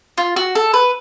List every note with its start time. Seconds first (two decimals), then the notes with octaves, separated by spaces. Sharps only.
0.18 F4
0.36 F#4
0.55 A4
0.74 B4